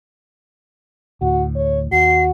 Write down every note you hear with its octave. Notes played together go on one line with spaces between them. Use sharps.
D2 A2 F#4
C#5
D#2 F#4 C7